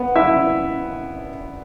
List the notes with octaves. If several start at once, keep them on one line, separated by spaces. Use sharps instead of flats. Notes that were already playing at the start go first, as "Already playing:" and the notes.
Already playing: B3 B4
E4 E5